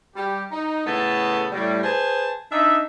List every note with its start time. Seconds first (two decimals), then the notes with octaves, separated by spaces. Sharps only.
0.16 G3 G4
0.52 D#4
0.87 A2 C#3 B3 A4 A5
1.52 A2 G3
1.84 G#4 B4 C5 A5
2.52 D4 D#4 E5